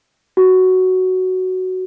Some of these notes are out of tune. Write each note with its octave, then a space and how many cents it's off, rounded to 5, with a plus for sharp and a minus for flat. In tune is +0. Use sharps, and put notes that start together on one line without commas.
F#4 +5